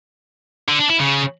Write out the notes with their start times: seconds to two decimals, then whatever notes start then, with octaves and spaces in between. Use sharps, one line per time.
0.68 D3
0.79 D4
0.90 E4
1.01 C#3